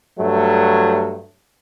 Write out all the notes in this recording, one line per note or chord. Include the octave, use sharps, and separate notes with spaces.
G2 F#3 A3